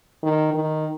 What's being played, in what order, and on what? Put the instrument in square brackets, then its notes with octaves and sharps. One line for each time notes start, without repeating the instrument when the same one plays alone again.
[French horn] D#3
D#3